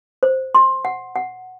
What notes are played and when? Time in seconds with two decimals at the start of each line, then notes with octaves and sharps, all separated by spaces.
0.23 C5
0.55 C6
0.85 F#5
1.16 F#5